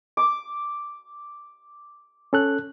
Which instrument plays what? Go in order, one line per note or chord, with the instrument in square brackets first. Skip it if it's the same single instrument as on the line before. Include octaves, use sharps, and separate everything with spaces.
[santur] D6
[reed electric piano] C#4 A4 F#6